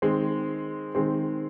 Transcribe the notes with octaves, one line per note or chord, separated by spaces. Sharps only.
D#3 G#3 C4
D#3 G#3 C4